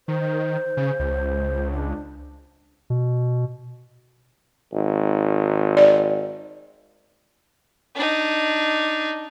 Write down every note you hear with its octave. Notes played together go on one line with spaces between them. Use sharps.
D#3 C5
C#3
C#2
D4
B2
G#1
D5
D4 D#4